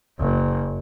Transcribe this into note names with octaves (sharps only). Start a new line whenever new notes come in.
F#1 F#2